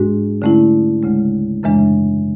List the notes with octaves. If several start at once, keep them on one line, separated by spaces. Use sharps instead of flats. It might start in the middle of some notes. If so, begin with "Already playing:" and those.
Already playing: G#2 G#3 D4 F#4
D3 A3 C#4 E4
D2 C#3 G#3
F#2 C#3 E3 G#3 D4